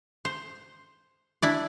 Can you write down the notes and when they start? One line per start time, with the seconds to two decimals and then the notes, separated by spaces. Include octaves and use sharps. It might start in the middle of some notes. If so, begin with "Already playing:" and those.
0.25 C5
1.42 D4 E4 D5